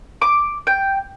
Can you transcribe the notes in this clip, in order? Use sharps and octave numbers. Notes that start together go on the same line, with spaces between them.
D6
G5